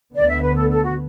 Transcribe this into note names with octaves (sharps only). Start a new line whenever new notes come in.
D2 D3 B3 D5
E5
B4
A4
A4
F#4